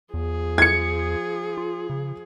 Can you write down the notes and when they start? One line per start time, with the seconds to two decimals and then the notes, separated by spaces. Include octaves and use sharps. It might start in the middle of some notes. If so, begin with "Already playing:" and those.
0.14 E2 F3 G#4
0.58 G#6 C#7
1.57 F4
1.90 C#3